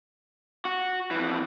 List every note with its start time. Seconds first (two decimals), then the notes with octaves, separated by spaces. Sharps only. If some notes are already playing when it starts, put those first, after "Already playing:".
0.65 F#4
1.11 F2 E3